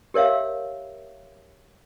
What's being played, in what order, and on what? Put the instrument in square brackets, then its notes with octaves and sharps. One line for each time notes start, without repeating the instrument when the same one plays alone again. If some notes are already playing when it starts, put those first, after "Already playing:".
[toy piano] G4 A#4 C#5 E5 F5